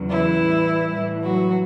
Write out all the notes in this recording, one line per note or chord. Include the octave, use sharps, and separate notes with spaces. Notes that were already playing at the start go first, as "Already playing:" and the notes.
Already playing: E2 C#3 F#3
E3 E4
A2 G3
A2 E3 G3
F#3 F#4